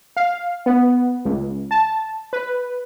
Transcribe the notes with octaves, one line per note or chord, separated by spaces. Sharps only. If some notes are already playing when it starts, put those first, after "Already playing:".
F5
B3
C#2
A5
B4